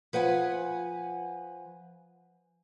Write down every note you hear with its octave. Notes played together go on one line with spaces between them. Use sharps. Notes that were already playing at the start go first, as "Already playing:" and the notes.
F3 B4 F#5 G#5